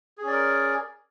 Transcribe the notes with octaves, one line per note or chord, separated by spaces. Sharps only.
C#4 G#4 A#4 D5